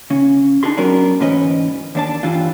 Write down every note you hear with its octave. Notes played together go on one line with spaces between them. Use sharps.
C#3 C#4
D4 D#4 G#4 C6
F#3 B3 C#4 A#4 B4 D5
D2 G#2 E3 C#4 B4 D#5
D#2 D4 A5
G2 E3 G3 D4 F4